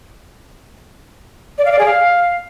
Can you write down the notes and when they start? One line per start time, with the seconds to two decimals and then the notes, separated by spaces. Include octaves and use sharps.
1.58 D5
1.65 F5
1.72 D5
1.79 G#4
1.86 F5